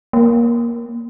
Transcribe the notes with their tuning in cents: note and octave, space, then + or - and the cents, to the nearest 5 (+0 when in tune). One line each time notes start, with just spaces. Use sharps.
A#3 +15